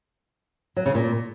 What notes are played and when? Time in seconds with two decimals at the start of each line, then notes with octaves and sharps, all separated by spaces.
0.76 F#3
0.86 C#3
0.95 A#2